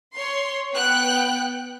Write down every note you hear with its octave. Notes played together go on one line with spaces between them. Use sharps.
C#5 C6
B3 G5 F#6